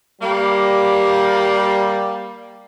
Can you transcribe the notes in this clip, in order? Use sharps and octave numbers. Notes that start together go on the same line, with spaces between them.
G3 A#3